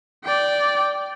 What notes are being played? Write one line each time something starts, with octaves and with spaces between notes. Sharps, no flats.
D5 G5